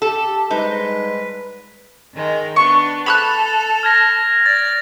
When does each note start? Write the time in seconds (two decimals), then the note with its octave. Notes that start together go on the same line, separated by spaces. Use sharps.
0.02 G4 A4
0.51 G#2 G3 G#3 D#4 B4
2.14 D#3 G#3 A#4
2.56 B3 D4 C#6
3.06 A4 B5 E6 F#6 F7
3.83 F6 G#6 A#6
4.46 D5 A6